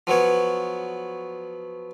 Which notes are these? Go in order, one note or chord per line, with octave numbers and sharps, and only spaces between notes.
F3 F#3 B3 C#5